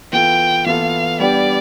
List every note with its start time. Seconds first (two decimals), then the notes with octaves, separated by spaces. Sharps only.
0.12 E3 B3 F4 A4 G5
0.66 E3 B3 F4 A4 F5
1.20 G3 B3 D4 G4 D5